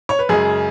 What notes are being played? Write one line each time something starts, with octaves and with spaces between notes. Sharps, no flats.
C#5
B4
F#2 C#3 G#3 G#4